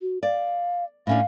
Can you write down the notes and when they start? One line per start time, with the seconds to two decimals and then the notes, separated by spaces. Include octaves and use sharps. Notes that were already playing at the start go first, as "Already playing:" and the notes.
0.01 F#4
0.23 D5 F5
1.07 A2 C#4 D4 F5